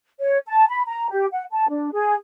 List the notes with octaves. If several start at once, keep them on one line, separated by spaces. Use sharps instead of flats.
C#5
A5
B5
A#5
G4
F#5
A5
D4
G#4